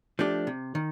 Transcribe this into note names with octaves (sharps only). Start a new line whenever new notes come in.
F3 A3 D4 G4
C3
D#3